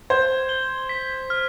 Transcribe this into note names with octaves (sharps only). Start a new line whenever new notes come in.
C5 G#6
G7
B6
F6